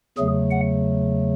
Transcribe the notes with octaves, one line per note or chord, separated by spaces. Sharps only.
E2 C#3 F#3 A3 G#4
F#5